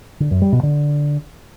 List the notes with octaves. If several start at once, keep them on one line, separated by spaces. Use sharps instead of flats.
D3
F#2
G3
B2
D3